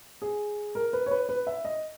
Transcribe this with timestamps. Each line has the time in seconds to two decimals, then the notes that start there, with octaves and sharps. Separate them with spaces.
0.22 G#4
0.75 A#4
0.93 B4
1.06 C#5
1.11 B4
1.29 B4
1.47 E5
1.65 D#5